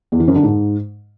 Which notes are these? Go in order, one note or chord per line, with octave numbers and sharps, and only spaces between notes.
E2
E3
F#2
D3
G#2